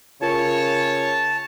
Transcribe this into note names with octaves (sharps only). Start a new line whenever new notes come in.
C#3 F4 A#4 C#5 A5 C#7